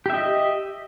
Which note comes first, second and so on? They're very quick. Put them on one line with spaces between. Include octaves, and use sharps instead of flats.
G4 E5 D#5